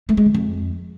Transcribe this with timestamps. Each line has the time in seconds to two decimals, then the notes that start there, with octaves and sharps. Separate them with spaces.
0.09 A3
0.17 G#3
0.26 D3
0.34 F2